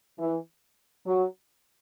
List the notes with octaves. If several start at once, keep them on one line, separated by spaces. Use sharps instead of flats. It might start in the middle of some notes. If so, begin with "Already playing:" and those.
E3
F#3